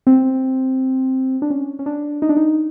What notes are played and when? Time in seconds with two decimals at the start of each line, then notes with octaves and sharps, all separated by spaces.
0.07 C4
1.42 D4
1.50 C#4
1.79 C#4
1.86 D4
2.22 D#4
2.29 D4
2.37 D#4